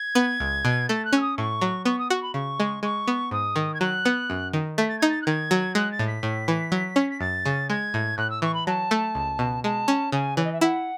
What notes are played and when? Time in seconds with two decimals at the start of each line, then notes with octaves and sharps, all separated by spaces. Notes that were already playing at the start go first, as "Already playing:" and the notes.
Already playing: G#6
0.15 B3
0.40 C#2
0.65 B2
0.89 A3 A6
1.05 F#6
1.13 C#4 E6
1.21 D#6
1.37 A2 C#6
1.61 F#3
1.85 B3 C#6
1.99 D#6
2.10 F#4 C#6
2.22 B5
2.34 C#3 C#6
2.60 G#3
2.83 G#3 C#6
3.08 B3
3.31 G#2 D#6
3.56 D#3
3.74 G#6
3.80 F#3 F#6
4.05 B3
4.30 F#2
4.53 D#3
4.78 A3 B6
4.88 A6
4.99 D#4 G#6
5.09 A6
5.22 F#6
5.26 D#3 G#6
5.51 F#3
5.75 G#3 F#6
5.92 A6
5.99 A2
6.07 B6
6.23 A2
6.48 E3
6.72 F#3
6.96 C#4
7.10 B6
7.20 F#2 A6
7.45 C#3
7.70 G#3 G#6
7.94 A2
8.18 A2 F#6
8.30 E6
8.42 E3 C#6
8.54 B5
8.67 F#3 A5
8.91 A3
9.15 C#2
9.39 B2
9.64 G#3 A5
9.88 C#4
10.12 C#3 G#5
10.37 E3 C#5
10.45 D#5
10.53 E5
10.61 E4 F#5